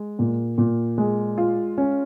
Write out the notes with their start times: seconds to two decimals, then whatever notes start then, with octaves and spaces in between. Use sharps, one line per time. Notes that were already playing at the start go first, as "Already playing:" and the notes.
Already playing: G#3
0.19 A#2
0.58 A#2
0.98 G#3
1.38 F4
1.78 C#4